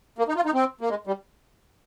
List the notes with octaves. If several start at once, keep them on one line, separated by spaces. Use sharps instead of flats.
A#3
D#4
F4
D#4
C4
A#3
G#3
G3